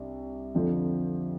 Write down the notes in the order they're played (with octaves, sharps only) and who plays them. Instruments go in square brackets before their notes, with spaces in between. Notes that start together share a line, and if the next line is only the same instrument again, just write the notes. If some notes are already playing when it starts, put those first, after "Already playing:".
Already playing: [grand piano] C2 D4
F2 D3 F3